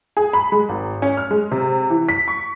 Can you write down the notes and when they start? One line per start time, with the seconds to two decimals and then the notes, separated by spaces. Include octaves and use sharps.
0.17 G#4
0.33 B5
0.52 G#3
0.69 G#1
1.02 C#4
1.17 F6
1.31 G#3
1.52 C3
1.90 E3
2.09 B6
2.28 C#6